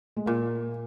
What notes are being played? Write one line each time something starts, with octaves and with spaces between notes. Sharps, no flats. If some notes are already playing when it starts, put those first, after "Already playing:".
G#3
A#2 A#3